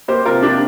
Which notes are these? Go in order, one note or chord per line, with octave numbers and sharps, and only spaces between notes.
A#3 G4 C5
C3 F4 A#4
A#3 D4 G4